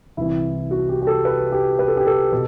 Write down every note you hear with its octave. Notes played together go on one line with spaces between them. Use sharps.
C2 C3 E3 E4
F#4
G4
G4
A4
B4
G4
B4
A4
G4
A4
B2